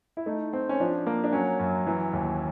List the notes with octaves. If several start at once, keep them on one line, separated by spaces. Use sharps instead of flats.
E4
A3 D#4
C4
C#4
F3 D4
A#3
D4
F#3 C#4
F#2
E3
D#2